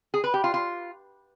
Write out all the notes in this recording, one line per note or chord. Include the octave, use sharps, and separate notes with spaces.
G#4
B4
G4
F4
F4